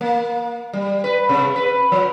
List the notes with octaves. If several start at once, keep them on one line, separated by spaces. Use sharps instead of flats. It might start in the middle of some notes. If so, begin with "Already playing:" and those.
A#3
G3
B4
C3
B4
F3